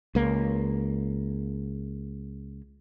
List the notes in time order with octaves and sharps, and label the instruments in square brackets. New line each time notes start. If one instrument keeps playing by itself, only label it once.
[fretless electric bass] C#2 A#3